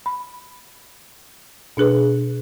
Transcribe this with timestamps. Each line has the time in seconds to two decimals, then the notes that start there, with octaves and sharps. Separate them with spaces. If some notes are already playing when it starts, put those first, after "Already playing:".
0.06 B5
1.77 B2 D4 G#4 B4